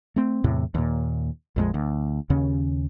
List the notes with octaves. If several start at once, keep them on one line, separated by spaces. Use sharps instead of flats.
A3 C4
E2 A2 C3
D#2 A#2
A#1 F2 G#3
D2
D#2 C#3 C#4